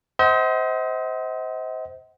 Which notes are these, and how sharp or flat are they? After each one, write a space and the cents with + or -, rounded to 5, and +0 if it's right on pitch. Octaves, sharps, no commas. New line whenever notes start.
C5 -10 D#5 +40 F#5 +20